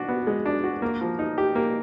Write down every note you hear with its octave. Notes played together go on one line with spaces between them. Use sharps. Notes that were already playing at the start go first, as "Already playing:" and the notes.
Already playing: D4 F#4
B3
G#3
D4
F#4
A#3
F3
D#4
G4
A#3